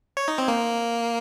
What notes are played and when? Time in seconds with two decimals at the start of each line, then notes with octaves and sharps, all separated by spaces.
0.17 C#5
0.28 D#4
0.38 C4
0.48 A#3